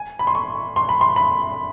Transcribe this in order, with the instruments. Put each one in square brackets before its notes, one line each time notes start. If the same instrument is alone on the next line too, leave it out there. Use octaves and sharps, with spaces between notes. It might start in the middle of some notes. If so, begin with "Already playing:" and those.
Already playing: [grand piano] G#5
B5
C6
C#6
C6
B5
C6
B5